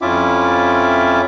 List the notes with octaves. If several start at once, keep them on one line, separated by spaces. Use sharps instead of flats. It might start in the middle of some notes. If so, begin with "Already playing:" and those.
F2 C#4 E4 F4 E5 D6